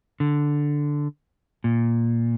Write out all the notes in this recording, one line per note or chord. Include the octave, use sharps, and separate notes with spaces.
D3
A#2